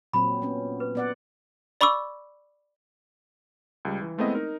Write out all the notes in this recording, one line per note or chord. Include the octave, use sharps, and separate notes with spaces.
A#2 F#3 C4 B5
B3 C#4
B4
B3 D5 F#5
D5 B5 C#6 D6 E6
C#2 G3
E3
G#3 A3 B3 C4 E4 D#5
D#4 A#4